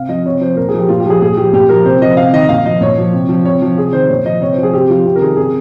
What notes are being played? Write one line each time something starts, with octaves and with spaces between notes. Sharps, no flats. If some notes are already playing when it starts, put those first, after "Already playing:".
Already playing: C3 F5
F3 D#5
C3 C#5
F3 C5
A#2 A#4
G#4
F3
G4
A#2 F4
G4
F3 G#4
A#2 G#4
F3 G4
A#2 G4
F3 A#4
C3 C5
F3 D#5
C3 F5
D#3 D#5
A#2 F5
F3 D#5
A#2 C#5
F3
C3
F3
C3 C#5
F3
C3 G#4
D#3 C5
A#2 C#5
F3 D#5
C3 C#5
C5
F3
G#4
C3 G4
F3 F4
C3 G4
A#4
D#3 G#4
C3 G#4